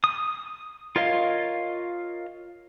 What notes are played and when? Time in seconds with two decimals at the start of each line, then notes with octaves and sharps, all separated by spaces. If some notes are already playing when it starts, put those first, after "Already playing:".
0.04 D#6
0.96 F4 A#4 C#5 D#5 F5